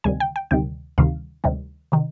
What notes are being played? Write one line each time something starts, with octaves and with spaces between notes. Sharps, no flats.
D2 C3 D#3 G3 G#5
G5
G5
D2 C3 D#3 G3 G5
D2 C3 D#3 G3 F5
D2 C3 D#3 G3
C3 D#3